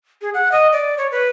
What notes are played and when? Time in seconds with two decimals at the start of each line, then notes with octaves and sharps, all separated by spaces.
0.21 G#4
0.34 F#5
0.52 D#5
0.73 D5
0.98 C#5
1.12 B4